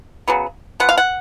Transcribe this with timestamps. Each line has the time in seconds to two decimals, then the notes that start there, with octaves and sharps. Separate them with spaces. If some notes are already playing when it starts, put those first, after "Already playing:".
0.28 C#3 F#3 B3
0.80 F3 B3 F#5
0.89 F5
0.98 F#5